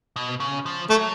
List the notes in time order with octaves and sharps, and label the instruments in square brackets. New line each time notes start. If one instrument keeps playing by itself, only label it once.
[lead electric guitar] B2
C#3
F3
[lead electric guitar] F#3 [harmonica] A3